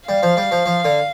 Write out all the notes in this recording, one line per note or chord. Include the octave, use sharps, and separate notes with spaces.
G3 F5
F3
G3
F3
F3
D3